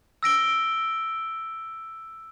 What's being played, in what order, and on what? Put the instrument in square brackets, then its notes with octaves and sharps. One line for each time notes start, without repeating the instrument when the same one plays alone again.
[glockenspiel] E6 A#6 D7 G7